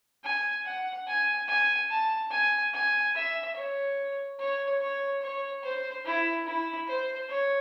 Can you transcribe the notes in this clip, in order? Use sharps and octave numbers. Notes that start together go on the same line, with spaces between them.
G#5
F#5
G#5
G#5
A5
G#5
G#5
E5
C#5
C#5
C#5
C#5
C5
E4
E4
C5
C#5